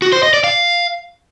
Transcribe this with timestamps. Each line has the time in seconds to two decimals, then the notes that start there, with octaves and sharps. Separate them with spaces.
0.02 F#4
0.13 C5
0.23 D#5
0.33 D5
0.44 F5